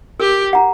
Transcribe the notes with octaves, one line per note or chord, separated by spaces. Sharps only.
G4 A#4
F#5 A#5